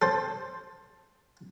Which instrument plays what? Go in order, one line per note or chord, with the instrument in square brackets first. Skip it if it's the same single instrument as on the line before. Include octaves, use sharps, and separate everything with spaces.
[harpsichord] A4 C5